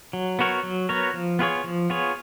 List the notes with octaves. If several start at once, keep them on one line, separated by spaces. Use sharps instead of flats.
F#3
B3 F#4 A#4 C#5
F#3
B3 F#4 A#4 C#5
F3
B3 F4 G#4 C#5
F3
B3 F4 G#4 C#5